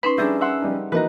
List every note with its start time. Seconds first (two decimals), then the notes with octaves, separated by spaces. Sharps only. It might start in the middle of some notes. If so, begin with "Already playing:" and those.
0.03 C#4 D#4 B4 B5 C6
0.18 G3 C#4 D4 G#4 A#4 E5 G6
0.41 E5 F#5 C6
0.62 G3 D#4
0.92 E3 A#3 D#4 F#4 B4 D#5 A#5